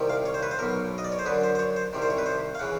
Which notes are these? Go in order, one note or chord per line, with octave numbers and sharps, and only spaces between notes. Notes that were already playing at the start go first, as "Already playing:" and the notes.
Already playing: C2 C3 D#3
F5
C#5
C5
B4
C5
B1 B2 A#4
D#5
D5
C#5
C5
F#2 D3 B4
C5
C5
C#5
C5
C2 C3 D#3
C5
C#5
B4
C5
F5
C#3 E3 F#5